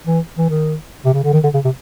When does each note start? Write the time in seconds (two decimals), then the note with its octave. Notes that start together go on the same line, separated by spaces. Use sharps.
0.07 E3
0.38 E3
0.49 D#3
1.05 C3
1.14 C#3
1.24 D3
1.33 D#3
1.43 D3
1.54 C#3
1.65 C3